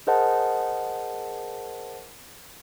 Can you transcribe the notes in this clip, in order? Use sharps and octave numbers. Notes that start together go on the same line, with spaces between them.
G#4 A#4 C5 D#5 F#5 A5